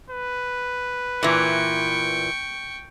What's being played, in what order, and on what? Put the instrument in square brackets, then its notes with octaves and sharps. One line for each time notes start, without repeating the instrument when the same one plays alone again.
[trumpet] B4
[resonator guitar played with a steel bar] A#2 E3 [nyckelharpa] G5 C#6